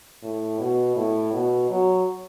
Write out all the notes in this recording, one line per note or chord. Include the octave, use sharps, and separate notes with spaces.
A2
B2
A2
B2
F#3